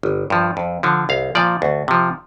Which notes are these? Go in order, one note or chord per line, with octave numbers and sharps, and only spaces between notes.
G1
G2 F3
F2
D3 F3
C2 F5
A#2 F3 D5
D2
C3 F3